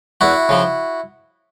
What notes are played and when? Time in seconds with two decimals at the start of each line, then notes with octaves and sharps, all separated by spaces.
0.21 E2 E4 F#4
0.49 C#3 F3